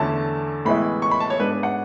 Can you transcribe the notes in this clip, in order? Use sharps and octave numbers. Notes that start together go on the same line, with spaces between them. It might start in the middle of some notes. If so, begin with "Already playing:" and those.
Already playing: E2 D3 A3 C#4 E4 A5
A2 E3 G#3 B3 E4 B5
C#6
B5
A5
C#5
G#2 G#3 B3 D4 B4
B4
F#5